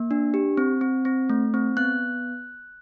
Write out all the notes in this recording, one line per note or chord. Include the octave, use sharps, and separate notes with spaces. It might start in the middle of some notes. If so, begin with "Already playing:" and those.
Already playing: A#3
D4
G4
C4
C4
C4
A3
C4
B3 F#6